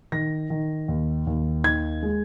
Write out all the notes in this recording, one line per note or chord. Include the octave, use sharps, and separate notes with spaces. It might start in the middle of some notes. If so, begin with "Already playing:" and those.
D#3 A#6
D#3
D#2
D#2
D#3 G#6
G#3